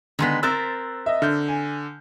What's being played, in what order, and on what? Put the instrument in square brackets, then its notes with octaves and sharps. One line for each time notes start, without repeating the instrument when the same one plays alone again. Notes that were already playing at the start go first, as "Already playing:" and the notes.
[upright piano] D3 C6 B6 [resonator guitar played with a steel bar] D#3 G#3 B3
[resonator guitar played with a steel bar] C4 A#4 C5 [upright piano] E6 F#6 A6
[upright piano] D#5 E5
[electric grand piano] D3 G6 [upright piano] F6
[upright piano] G#5